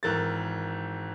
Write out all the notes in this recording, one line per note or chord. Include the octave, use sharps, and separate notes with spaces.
G#1 E3 A#4 A6